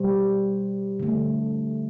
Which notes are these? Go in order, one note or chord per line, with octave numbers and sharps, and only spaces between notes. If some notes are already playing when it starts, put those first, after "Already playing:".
Already playing: B2 G3 C5
D3 A3